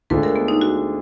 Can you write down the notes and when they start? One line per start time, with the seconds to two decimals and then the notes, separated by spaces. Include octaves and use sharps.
0.10 D2 D3 G#3 D4 F4 B4
0.23 A#4
0.36 B3
0.48 D#4
0.61 F#4